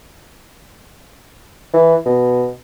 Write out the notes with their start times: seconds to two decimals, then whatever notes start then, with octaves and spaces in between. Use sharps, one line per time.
1.74 E3
2.06 B2